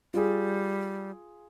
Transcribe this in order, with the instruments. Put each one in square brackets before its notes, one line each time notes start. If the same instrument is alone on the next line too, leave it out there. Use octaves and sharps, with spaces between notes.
[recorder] G3 [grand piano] F4 G#4